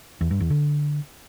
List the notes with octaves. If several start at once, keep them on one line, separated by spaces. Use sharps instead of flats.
E2
G2
E2
D3